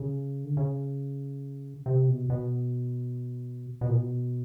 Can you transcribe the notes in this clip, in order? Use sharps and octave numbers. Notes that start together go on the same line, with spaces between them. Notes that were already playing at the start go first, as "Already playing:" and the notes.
Already playing: C#3
D3
C#3
C3
B2
B2
B2
A#2
B2